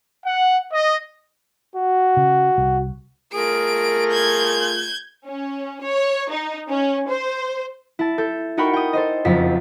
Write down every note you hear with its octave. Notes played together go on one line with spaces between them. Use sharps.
F#5
D#5
F#4
C#3
C2
A3 F4 G#4 A#4 D7
G6 G#6
C#4
C#5
D#4
C#4
C5
E4 A5
A4 G6
D#4 F#4 A#4 G5 B5 C#6
G5 D#6
A4 C5 D#5
F#1 F2 F5 B6